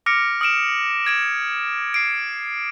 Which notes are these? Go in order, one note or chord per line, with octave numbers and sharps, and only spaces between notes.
D6 F6 A#6 C#7 D7
D#6 F6 D7 E7
G#6 D7 E7
C7 D7